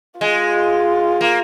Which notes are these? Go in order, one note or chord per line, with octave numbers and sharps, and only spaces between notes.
G#3 F4
A#3